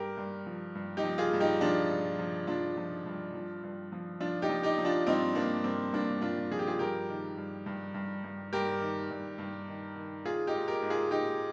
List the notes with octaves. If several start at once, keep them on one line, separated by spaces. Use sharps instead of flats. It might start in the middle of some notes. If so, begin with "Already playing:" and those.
Already playing: G2 G4 A#4
G2
F3
G2
D#4 G4
F3
F4 G#4
G2
D#4 G4
F3 D4 F4
G2
F3
F3 D4 F4
F3
G2
F3
G2
F3
F3 D4 F4
D#4 G4
F3
D#4 G4
F3
D4 F4
G2 C4 D#4
G2 A#3 D4
G2 C4
G2 A#3 D4
G2 D4 F4
F3 G#4
G4
F4 G#4
G2 G4 A#4
D#3
G2
G2
G2
G2
G2 G4 A#4
D#3
G2
G2
D#3
D#3
D#3 F4 G#4
D#4 G4
G#2
G4 A#4
G#2
F4 G#4
G#2 D#4 G4